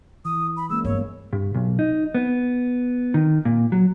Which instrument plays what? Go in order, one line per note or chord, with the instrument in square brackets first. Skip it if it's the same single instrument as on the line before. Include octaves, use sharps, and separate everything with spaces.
[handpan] E3 [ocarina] D#6
[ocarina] B5
[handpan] G#3 A#3 C#4 [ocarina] E6
[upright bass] G1 [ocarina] C#5
[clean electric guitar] G2
B1
D#4
B3
D#3
A#2
F#3